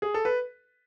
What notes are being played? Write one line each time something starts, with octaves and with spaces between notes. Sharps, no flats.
G#4
A4
B4